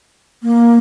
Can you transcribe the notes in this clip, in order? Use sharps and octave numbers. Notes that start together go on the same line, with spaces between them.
A#3